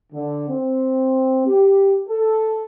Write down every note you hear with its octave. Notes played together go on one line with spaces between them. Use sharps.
D3
C4
G4
A4